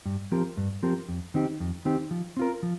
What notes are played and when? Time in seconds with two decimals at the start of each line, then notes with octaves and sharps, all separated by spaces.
0.06 G2
0.32 F3 C4 G4 A#4
0.57 G2
0.83 F3 C4 G4 A#4
1.09 F2
1.34 D#3 C4 D#4 G4
1.60 F2
1.85 D#3 C4 D#4 G4
2.11 F3
2.37 C4 F4 A#4
2.63 F3